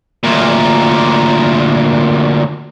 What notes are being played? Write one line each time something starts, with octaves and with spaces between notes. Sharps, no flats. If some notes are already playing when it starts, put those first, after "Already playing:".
D2 A#2